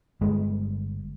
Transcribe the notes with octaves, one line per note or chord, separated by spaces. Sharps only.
G1 G#3